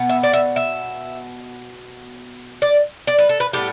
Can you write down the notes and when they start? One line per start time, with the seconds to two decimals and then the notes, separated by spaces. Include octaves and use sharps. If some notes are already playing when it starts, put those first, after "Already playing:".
Already playing: B2 B3
0.09 E5
0.23 D5
0.33 E5
0.56 E5
2.62 D5
3.07 D5
3.18 B4
3.29 A4
3.40 B4
3.53 A2 G3 B3 G4